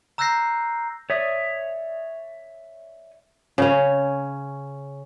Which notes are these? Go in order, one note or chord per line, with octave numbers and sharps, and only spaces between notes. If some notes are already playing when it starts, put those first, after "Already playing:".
A#5 E6 F#6 G6 A#6 C7
C#5 D5 E5 D#6
C#3 C#4